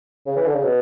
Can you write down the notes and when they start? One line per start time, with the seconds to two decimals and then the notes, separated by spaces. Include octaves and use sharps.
0.26 C#3
0.36 E3
0.46 D3
0.55 C#3
0.64 B2